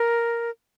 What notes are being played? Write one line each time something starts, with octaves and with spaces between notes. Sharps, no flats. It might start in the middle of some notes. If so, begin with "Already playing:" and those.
Already playing: A#4